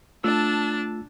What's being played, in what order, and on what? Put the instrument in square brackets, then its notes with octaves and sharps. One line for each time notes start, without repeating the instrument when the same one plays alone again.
[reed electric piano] A3 F4 E6 [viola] D4 A5